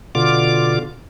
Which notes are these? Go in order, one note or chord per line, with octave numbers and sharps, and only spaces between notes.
B2 D3 F4 D6